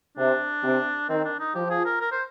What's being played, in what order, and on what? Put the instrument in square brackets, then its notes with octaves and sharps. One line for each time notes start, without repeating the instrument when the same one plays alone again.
[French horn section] C3 [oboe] D4
[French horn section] C3
[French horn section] D#3 [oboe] C4
[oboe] D4
D#4
[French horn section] F3 [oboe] G4
[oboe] G#4
A#4
A#4
C5